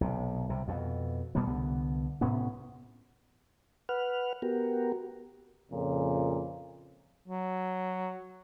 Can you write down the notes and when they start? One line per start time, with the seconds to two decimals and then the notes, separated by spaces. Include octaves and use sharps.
0.01 B1 C3
0.50 C2 C3
0.68 F2 B2
1.35 B2 G3 A#3 B3
1.47 C2 D3 B3
2.21 A2 C3 B3 C#4
3.89 B4 F#5 F6
4.42 B3 F#4 G4 A#4
5.72 F2 A#2 C#3
7.28 F#3